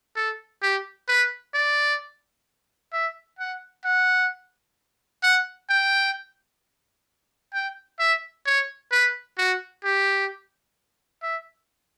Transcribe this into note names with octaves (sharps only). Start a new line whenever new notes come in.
A4
G4
B4
D5
E5
F#5
F#5
F#5
G5
G5
E5
C#5
B4
F#4
G4
E5